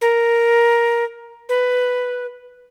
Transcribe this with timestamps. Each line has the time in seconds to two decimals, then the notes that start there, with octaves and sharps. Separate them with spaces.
0.01 A#4
1.49 B4